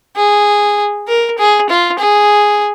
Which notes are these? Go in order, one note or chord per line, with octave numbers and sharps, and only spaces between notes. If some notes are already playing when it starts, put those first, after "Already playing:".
G#4
A#4
G#4
F4
G#4